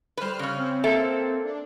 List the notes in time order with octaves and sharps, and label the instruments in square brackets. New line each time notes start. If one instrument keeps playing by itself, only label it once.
[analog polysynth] G3 F6 F#6 [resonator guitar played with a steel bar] B4 C5
[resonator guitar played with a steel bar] C#3 C#4
[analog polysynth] C4
[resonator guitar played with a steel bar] A#3 A4 E5
[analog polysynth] D4